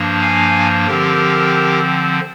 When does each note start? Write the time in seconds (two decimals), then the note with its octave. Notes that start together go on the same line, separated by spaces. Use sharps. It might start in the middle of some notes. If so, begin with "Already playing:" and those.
Already playing: G2 F3 A#3 D4
0.21 F5 G#5
0.87 D3 F3 C4 G4 A#4